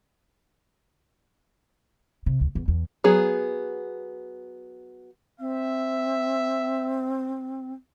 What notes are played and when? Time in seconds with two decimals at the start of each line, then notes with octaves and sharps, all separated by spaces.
2.26 C3
2.41 D2
2.55 E2
2.68 E2
3.04 F#3 B3 G#4
5.40 C4 E5